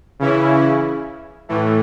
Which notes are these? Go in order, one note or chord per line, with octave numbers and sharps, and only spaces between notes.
C#3 E3 C#4 E4
A2 E3 A3